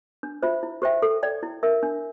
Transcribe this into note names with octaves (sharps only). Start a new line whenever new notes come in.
D4
F4 C5 E5
E4
G4 C5 E5 G5
A4
D5 G5
E4
A#4 E5
D4